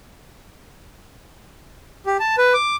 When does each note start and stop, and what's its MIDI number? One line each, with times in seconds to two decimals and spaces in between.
2.06 2.17 67
2.20 2.36 81
2.38 2.53 71
2.54 2.76 86